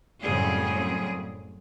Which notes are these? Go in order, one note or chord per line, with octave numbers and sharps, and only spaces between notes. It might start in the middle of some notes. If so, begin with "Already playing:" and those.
F#2 A2 C#3 G3 C4 G#4